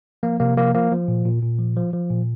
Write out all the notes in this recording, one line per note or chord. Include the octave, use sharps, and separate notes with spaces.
F3 A#3
C3 A#3
F3 A#3
F3 A#3
F3
A#2
A#2
A#2
F3
F3
F3
A#2